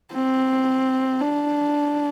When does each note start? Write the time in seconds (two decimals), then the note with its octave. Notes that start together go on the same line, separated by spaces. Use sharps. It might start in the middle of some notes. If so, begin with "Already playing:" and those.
0.13 C4
1.21 D4